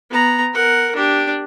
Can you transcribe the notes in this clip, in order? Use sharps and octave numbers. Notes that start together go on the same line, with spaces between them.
B3 A#5
A#4 F#5
D4 G4